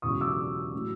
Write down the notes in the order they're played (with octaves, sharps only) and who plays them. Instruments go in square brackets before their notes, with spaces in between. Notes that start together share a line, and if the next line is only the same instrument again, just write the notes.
[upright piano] E1 E2 C#3 F#3 C#6 D#6
D6 E6
A2 F#3